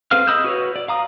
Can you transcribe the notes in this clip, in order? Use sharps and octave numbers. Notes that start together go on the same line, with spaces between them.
C4 G#4 B4 F5 F6
D#5 B5 D#6 E6 G6
F#4 B4 C#5
D5
F5 A#5 D#6